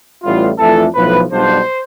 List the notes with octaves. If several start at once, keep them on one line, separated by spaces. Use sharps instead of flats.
A1 A2 G3 B3 F4
F2 E3 A3 D4 F4 A4
B1 A2 F3 B4
B1 B2 G3 D4 F4 C5